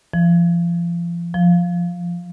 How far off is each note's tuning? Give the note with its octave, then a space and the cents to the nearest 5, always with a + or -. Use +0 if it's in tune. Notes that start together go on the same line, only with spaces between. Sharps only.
F3 -35
F3 +0